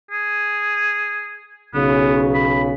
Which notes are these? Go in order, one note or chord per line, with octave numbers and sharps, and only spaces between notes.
G#4
B1 C#3 B3
B5